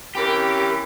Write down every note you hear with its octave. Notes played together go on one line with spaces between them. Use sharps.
E3 C4 C#4 G4 A#4